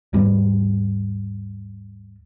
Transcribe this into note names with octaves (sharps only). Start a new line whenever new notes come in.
D#2 G#2 G3 B3